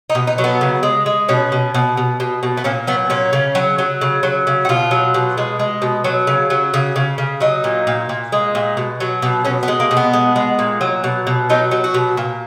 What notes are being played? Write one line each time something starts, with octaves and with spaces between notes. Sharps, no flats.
D#4
B2
D#4
F#3
B3
C#3
G#3
G#3
B2 C#4
B2
B2
B2
B2
B2
B3
A#2 C#4
F#3 B3
A#2 C#4
C#3
F#3
F#3
C#3
F#3
C#3
F#4
B2 F4
F#3
B2
G#3
G#3
B2
F#3
C#3
F#3
C#3
C#3
C#3
F#3 D#4
A#2
A#2
A#2
G#3
A#2
B2
F#3
B2
B2 C#4
B3
G#3
A#3
B2
B3
G#3
G#3
A#2
F#3
B2
B2
F#3 D#4
F#3
F#4
B2
A#2